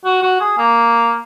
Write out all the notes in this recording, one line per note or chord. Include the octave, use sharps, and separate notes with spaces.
F#4
F#4
G#4
A#3